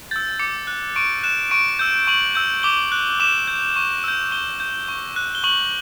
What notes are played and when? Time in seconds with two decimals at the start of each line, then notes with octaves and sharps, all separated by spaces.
0.11 E6 G6 A6
0.39 D6 C#7
0.67 F#6
0.96 C#6 D7
1.23 F#6 E7
1.51 C#6 D7
1.79 E6 G6
2.07 C#6 F#7
2.35 E6 G6
2.63 D6 G7
2.92 F#6
3.20 D6 E7
3.48 G6
3.76 C#6
4.04 E6 G6
4.32 C#6 G7
4.60 G6
4.88 C#6
5.16 F#6
5.35 G7
5.44 C#6 F#7